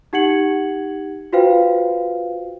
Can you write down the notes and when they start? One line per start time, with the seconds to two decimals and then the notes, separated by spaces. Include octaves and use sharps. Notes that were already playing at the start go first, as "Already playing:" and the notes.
0.13 D#4 G4 F#5 G#6 C#7 F#7
1.33 F4 F#4 B4 C5 F5 G5